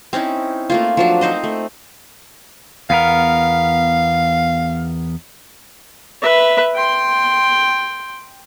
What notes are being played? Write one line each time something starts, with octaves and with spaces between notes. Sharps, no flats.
C4 C#4 D#4 E4
A3 A#3 F4
F3 F#3 D4
C4 D#4 C5 D#5
A3
E2 B3 A#4 F5
B4 E5
G5 C6